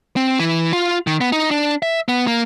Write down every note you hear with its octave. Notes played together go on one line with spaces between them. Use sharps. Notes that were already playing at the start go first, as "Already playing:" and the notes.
C4
E3
F4
D#3
B3
D#4
D4
E5
B3
A#3